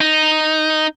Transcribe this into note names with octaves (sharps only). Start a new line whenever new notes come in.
D#4